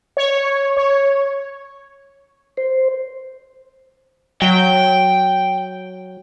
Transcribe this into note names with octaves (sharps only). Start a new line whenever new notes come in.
C#5
C#5
C5
F#3 G5